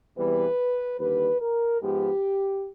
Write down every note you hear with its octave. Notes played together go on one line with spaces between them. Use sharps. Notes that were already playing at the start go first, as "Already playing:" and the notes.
E2 C3 E3 G3 B3 B4
D#2 D3 G3 B4
A#4
G#2 F3 G#3 B3 G4